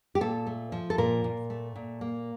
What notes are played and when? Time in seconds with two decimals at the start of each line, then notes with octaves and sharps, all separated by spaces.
0.15 G4
0.21 A#2 A4
0.47 A3
0.72 F3
0.90 A4
0.98 A#2 A#4
1.24 A#2
1.50 A3
1.76 A#2
2.01 A#3